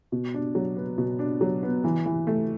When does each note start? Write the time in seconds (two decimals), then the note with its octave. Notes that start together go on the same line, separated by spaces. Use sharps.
0.12 B2
0.34 D4
0.55 F#3
0.77 B3
0.98 B2
1.19 D4
1.41 F#3
1.63 B3
1.84 E3
2.05 E3
2.27 A3